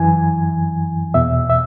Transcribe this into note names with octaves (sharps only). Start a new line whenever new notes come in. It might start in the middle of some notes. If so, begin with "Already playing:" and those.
Already playing: F#2 E3 G#5
E2 B2 E5
E5